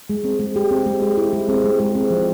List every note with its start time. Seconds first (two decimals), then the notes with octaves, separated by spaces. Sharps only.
0.10 G#3
0.24 C4
0.39 G#3
0.56 G4
0.71 C4
0.86 G#3
1.02 G4
1.17 E4
1.33 G#3
1.49 C4
1.64 G#3
1.80 G#3
1.95 C4
2.11 F3